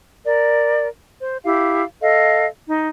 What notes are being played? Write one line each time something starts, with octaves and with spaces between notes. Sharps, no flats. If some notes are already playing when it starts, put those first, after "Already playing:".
A#4 D5
C5
E4 G4 F5
A4 D#5 F5
D#4